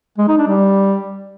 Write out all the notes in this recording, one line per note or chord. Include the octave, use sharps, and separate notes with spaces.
G#3
D#4
D4
G3